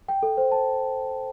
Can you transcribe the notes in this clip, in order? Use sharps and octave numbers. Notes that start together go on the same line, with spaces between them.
G5
A4
C5
A5